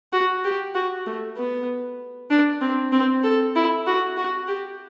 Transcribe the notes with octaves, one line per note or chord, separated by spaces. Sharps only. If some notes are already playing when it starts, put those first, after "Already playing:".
F#4
G4
F#4
A3
B3
D4
C4
C4
A4
E4
F#4
F#4
G4